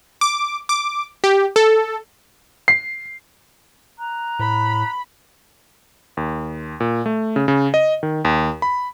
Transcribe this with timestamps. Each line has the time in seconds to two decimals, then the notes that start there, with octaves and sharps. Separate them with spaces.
0.21 D6
0.69 D6
1.24 G4
1.56 A4
2.68 C7
3.98 A#5 F#6
4.39 A2 B5
6.17 D#2
6.80 A#2
7.06 A3
7.36 C#3
7.48 C#3
7.74 D#5
8.03 D#3
8.25 D#2
8.62 B5